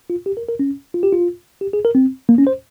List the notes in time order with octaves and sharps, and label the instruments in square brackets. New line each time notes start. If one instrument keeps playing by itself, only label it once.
[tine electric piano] F4
G4
A#4
A#4
C#4
F4
G4
F4
G4
G#4
A#4
C4
A#3
C#4
C5